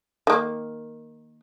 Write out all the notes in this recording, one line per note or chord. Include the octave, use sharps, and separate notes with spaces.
D#3 A#3